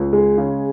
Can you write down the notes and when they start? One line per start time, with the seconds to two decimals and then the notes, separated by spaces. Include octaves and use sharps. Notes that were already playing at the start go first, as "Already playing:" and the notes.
Already playing: C#2
0.13 G#3
0.38 C#3